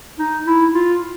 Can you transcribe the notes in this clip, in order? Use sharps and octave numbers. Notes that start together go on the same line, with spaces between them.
D#4
E4
F4